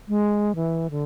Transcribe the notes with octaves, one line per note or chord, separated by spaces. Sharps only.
G#3
E3
D3